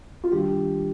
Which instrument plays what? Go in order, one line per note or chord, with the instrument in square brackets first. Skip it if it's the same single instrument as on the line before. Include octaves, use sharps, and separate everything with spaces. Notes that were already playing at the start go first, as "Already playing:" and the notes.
[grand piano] F4
[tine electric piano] D#3 G3 D4 [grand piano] G4